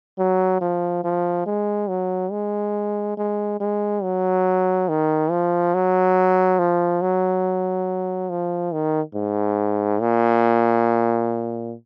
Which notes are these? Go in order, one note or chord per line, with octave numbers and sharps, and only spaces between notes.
F#3
F3
F3
G#3
F#3
G#3
G#3
G#3
F#3
D#3
F3
F#3
F3
F#3
F3
D#3
G#2
A#2